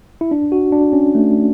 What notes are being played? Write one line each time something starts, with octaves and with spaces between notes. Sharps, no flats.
E4
D4
F#4
D4
C#4
A3